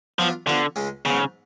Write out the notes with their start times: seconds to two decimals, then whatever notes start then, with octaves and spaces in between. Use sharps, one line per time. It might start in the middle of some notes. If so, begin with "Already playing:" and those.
0.19 F3 F#3 B3 D4 F4
0.47 D3 F3 B3 F#4
0.76 C#2 C#3 G#3 C#4
1.05 G#2 C#3 F#3 B3